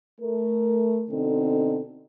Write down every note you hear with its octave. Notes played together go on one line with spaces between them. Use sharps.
A3 A#4
B2 D3 C4 D#4 A4